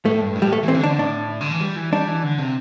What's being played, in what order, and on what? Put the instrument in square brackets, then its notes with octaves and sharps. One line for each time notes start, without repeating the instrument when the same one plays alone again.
[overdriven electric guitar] A2 [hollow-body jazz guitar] A3
[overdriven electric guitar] G2
A2
[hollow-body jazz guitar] G3
A3
[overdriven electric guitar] E3
[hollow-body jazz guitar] C4
[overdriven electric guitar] D3
[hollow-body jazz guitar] D4
[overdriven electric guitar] D3
[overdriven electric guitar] A2 [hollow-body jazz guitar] D4
[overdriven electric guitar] D3
E3
G3
E3
[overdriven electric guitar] G3 [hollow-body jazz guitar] D4
[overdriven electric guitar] E3
D3
C3